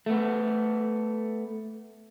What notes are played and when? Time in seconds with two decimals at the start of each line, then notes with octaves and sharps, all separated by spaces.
0.06 A3 B3